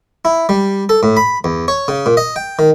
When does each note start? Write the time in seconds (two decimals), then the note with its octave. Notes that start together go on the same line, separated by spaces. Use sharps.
0.25 E4
0.49 G3
0.89 A4
1.03 A2
1.17 B5
1.44 E2
1.68 C#5
1.88 C#3
2.06 A#2
2.17 D#5
2.36 G5
2.59 D#3